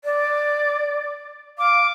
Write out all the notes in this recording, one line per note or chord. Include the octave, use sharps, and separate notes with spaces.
D5
F5 D6